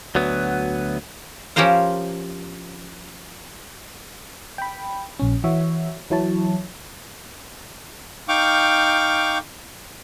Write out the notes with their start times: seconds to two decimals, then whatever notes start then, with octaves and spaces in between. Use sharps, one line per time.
0.15 D2 F#3 B3
1.56 F3 C#4 G4 A#4 C5 F5
4.58 G5 B5
5.19 A#1 C#4
5.44 E3 F#4 C#5 E5
6.10 E3 F#3 E4 C#5 A5
8.28 D#4 F5 G5 C#6 D6 F6